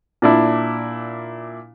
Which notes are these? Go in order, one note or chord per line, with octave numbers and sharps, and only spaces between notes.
A#2 D4 E4